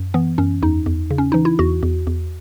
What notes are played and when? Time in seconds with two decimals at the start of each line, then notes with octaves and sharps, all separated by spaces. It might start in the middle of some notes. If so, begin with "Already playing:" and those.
Already playing: F#2
0.14 E3 B3
0.38 F#2 C#4
0.62 E2 D#4
0.86 E2
1.11 C#3
1.18 C#4
1.32 E3 D#4
1.45 E4
1.59 E2 F#4
1.83 E2
2.07 E2